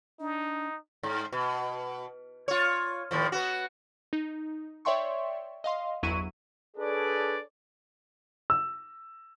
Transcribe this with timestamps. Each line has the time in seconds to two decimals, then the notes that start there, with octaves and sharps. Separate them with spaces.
0.20 D4 D#4
1.03 G#2
1.32 B2
2.48 F4 C#5
3.11 D#2 A2 F3
3.32 B3 F#4
4.13 D#4
4.85 C#5 D5 E5 G5 C6 C#6
5.64 D#5 F5 C6
6.03 G1 E2 F#3 E4 C#6 D#7
6.77 D4 G#4 A4 B4 C#5 D5
8.50 E6